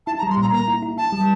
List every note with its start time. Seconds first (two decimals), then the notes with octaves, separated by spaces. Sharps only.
0.07 E4 A5
0.18 A#5
0.23 G3
0.30 C6
0.37 A#2 A#5
0.52 A#3 A#5
0.68 E4
0.83 E4
0.98 E4 A5
1.12 G3